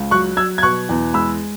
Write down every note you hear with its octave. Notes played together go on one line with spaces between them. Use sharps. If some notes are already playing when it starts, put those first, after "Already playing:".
Already playing: C#2
F#3 C#6 F#6
F#3 E6 G#6
G#6
B2 C#6 F#6
E2
G#3 B5 E6